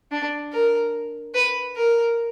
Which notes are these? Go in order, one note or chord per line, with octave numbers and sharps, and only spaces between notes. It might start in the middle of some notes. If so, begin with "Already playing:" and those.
D4
A#4
B4
A#4